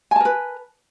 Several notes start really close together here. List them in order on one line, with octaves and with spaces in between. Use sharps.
G#5 A5 A#4 B4